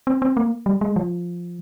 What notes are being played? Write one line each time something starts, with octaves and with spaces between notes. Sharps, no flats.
C4
C4
A#3
G3
G#3
F3